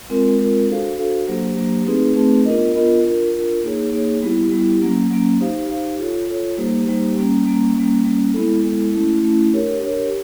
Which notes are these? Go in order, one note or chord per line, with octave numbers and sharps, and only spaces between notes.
G#3 C4 F4 A#4
G#3 C4 F4 A#4
D4 F#4 A4 C5 F5
D4 F#4 A4 C5 F5
F#3 A#3 D4 G4 C5
F#3 A#3 D4 G4 C5
A3 C4 D#4 G#4 B4
A3 C4 D#4 G#4 B4
B3 D4 F4 A#4 D#5
B3 D4 F4 A#4 D#5
D4 F4 A#4
D4 F4 A#4
A#3 D#4 G#4 C#5
A#3 D#4 G#4 C#5
G3 B3 E4 G4
G3 B3 E4 G4
F#3 A#3 C#4
F#3 A#3 C#4
D#4 G4 C5 F5
D#4 G4 C5 F5
F4 A4 C#5
F4 A4 C#5
G3 A#3 D#4 G4 C5
G3 A#3 D#4 G4 C5
G3 A#3 C#4
G3 A#3 C#4
G3 A#3 C#4
G3 A#3 C#4
G#3 B3 E4 A4
G#3 B3 E4 A4
A3 C#4 E4
A3 C#4 E4
D4 G4 A#4 C#5
D4 G4 A#4 C#5